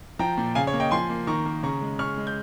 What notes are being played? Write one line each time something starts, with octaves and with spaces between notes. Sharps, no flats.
F3 G5 A#5
A#2
C#3 F5 G#5
C#5
A#3
D#5 G5
F3 G#5 C6
A#3
D#3 A#5 C#6
A#3
C#3 A#5 C#6
G#3
C#3 C#6 F6
G#3
G6